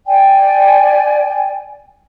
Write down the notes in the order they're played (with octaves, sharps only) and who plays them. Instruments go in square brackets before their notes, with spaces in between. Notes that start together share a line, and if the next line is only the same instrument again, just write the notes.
[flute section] D5 G5 G#5